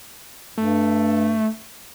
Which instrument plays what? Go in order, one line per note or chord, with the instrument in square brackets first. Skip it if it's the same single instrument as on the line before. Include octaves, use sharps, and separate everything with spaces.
[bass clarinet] G2 [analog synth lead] A3